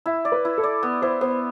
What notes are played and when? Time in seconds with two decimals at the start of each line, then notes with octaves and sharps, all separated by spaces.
0.06 E4 E5
0.25 D5
0.32 B4
0.45 E4
0.58 A4
0.64 D5
0.83 B3
1.02 E4 C5
1.21 B3 C5